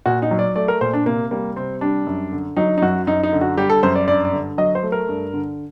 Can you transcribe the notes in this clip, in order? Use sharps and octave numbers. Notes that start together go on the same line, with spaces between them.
A#2 F#4
D#4
F#3
D5
A3 D5
A#4
A#2 C5
D4
C3 A#3
G3 A#3
C3 C4
G3 D4
F#2
D3
F#3 D#4
D#4
F#2 F#4
F#2 D#4
D#4
D3
F#4
G3 G4
A4
F#2 C5
D5
G2 D5
D5
D3
F#3 D#5
C5
A3
A#4
G2
D3